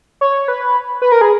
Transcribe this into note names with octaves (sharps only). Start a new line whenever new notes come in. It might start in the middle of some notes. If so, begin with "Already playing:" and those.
C#5
B4
B4
A#4
G#4